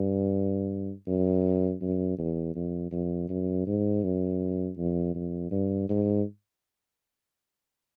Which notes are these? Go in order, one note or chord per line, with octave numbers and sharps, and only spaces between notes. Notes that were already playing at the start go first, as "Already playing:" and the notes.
Already playing: G2
F#2
F#2
E2
F2
F2
F#2
G#2
F#2
F2
F2
G2
G#2